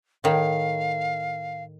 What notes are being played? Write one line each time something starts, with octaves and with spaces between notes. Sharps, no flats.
A2 D#3 F5